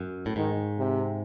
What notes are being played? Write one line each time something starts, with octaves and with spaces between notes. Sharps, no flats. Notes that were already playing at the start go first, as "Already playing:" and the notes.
Already playing: F#2
A2
G#2 D#3
C3